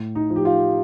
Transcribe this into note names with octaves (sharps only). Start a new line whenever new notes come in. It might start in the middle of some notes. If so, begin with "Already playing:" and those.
Already playing: A2
D#4
F3
G4
F4